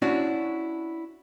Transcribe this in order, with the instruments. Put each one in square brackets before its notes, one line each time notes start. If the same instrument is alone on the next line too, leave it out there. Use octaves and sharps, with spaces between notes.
[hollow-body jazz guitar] C#4 D4 E4 F#4